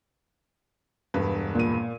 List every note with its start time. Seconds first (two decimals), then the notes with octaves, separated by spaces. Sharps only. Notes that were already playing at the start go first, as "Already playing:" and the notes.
1.14 E1 G2 B4
1.55 A#2 D#7